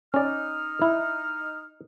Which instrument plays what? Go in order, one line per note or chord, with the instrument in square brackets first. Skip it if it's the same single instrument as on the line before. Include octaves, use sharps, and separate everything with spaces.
[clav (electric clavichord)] C#4 D5 [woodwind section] D#4 F6
[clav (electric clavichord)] E4